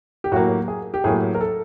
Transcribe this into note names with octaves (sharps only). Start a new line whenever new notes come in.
G4
A2 F#3 A#3 F#4
G#4
G4
A2 F#3 A#3 G#4
A#4
A4